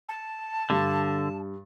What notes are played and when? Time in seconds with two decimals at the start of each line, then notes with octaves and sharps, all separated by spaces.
0.08 A5
0.70 G2 D3 A6